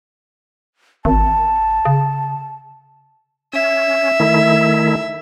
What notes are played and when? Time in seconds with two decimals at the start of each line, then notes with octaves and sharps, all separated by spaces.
1.05 G#1 A5
1.85 C#3
3.53 C#4 E5
4.20 D#3 A3 E4